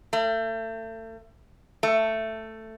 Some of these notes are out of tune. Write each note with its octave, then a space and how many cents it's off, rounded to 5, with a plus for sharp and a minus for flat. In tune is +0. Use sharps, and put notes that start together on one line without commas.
A3 +35
A3 +10